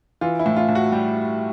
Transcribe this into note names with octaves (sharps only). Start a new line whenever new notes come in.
E3 F4
E4
A2
F4
A2
F#4
G3 G4